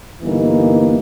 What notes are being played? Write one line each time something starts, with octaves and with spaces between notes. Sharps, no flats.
G1 E3 A#3 D#4